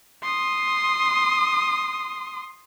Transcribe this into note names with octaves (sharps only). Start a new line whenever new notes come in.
C6 D#6